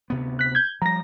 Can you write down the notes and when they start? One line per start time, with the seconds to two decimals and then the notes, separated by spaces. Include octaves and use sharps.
0.10 D2 C3 B3
0.39 F#6 B6
0.55 G6 G#6
0.82 F3 G3 A#5 A#6